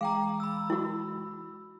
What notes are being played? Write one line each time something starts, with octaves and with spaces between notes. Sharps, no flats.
E3 G#3 F5 G5 A#5 D6
B5 E6
E4 F#4